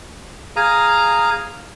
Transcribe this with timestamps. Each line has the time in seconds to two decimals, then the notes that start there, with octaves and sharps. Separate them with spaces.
0.56 G#4 F5 A#5 D#6